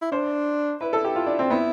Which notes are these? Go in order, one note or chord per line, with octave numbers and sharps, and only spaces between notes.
E4
D4 C5
E4 B4
A4
G4
F4
D4
C4
B3 E4